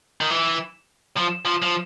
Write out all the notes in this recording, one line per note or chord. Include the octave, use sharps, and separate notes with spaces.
D#3
E3
F3
F3
F3